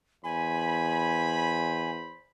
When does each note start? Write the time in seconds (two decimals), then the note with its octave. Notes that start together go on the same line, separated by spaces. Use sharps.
0.24 E2 C5 G#5 B5